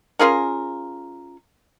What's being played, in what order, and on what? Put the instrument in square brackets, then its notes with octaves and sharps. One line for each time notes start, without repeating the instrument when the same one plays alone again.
[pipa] C#4 F4 G#4 A#4